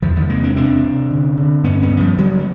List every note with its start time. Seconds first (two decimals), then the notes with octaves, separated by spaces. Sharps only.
0.02 E2 D#3 F3
0.16 D#3 F3
0.29 C3 G#3 A#3
0.43 C4 D4
0.56 C3 C4 D4
0.84 C3
1.10 D3
1.37 D3
1.64 G2 B3 C#4
1.82 B3 C#4
1.91 D3
2.00 F3 G3
2.18 C#3 F#3 G#3
2.39 B3